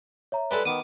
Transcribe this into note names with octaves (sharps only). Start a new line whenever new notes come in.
C#5 E5 A#5
G3 G#3 A4 B4
D#3 B3 D6 D#6 D#7